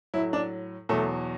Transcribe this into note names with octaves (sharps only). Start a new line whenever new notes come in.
A2 F#3 E4
D4
E2 B2 F#3 A3